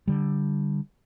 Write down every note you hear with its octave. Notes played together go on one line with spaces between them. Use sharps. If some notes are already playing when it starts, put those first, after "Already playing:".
D3 G3